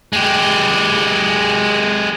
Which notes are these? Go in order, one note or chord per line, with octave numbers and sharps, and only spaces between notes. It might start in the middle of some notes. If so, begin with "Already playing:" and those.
G#3 G4